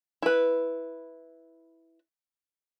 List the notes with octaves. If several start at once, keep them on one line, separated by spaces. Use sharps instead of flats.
E4 B4